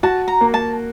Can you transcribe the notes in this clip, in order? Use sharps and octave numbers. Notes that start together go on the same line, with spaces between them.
F#4 A5
A#5
A#3
A5